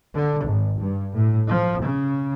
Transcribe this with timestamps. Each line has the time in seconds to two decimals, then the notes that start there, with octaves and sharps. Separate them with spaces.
0.14 D3
0.45 G#1
0.79 G2
1.15 A2
1.49 F3
1.83 C#3